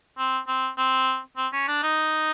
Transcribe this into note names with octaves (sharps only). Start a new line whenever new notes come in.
C4
C4
C4
C4
C#4
D4
D#4